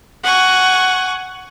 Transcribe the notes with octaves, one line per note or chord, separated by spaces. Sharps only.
F#5 G#5 C#6